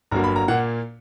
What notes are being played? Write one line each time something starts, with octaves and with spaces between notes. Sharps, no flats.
G1 G2 F#3 A#3 A#5
B5
A#5
A#2 A#3 F#5